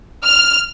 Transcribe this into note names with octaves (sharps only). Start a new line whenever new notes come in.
F6